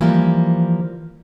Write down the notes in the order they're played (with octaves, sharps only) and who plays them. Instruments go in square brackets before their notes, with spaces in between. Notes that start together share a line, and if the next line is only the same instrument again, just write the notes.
[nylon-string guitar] E3 F3 G3 A#3